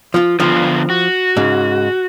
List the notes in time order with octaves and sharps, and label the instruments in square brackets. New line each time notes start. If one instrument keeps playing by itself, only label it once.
[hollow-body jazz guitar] F3 F4
[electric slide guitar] D3 B3 F4 [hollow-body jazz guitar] F3
[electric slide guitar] F#4
[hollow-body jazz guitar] G#2 C#3